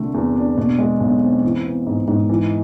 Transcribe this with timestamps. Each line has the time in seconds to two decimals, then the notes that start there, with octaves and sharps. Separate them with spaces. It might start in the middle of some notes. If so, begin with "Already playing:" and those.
Already playing: C2 D3 A3
0.14 E2
0.36 D4
0.57 B2
0.78 G#3
1.00 B1
1.22 C4
1.44 E3
1.65 B3
1.87 G#2
2.08 G#2
2.29 E3